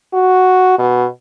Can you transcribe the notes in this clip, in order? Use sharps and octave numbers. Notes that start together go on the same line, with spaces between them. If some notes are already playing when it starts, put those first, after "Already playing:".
F#4
B2